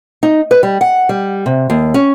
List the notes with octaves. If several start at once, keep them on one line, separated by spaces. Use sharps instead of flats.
D#4
B4
G3
F#5
G3
C3
D#2
C#4